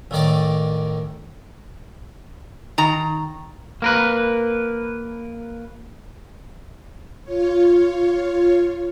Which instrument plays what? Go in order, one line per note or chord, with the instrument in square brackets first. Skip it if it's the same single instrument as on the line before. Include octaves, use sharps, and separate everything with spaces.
[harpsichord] A1 D#3 D5
[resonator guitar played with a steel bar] D#3 A#5
[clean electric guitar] A#3 A#4 B4
[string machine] F4 C#5